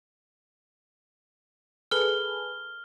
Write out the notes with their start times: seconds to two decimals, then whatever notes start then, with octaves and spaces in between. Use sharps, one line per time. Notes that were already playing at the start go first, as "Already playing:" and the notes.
1.91 G#4 A4 B4 F6 G7